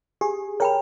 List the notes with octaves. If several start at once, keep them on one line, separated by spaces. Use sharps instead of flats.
G4 G#4
A#4 C#5 G5 B5